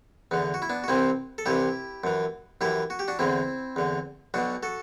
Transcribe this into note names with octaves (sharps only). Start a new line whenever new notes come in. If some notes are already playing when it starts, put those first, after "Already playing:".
E2 D3 B3
F#4
E4
B3 D4
F#4
C2 C3 E3 C4 E4
A4
C2 C3 E3 E4 G4
F#2 E3
F#2 E3 E4 G4
F#4
G4
D4 F#4
E2 D3 C4 E4
E2 D3
B1 B2 D4 F#4
F#4 A4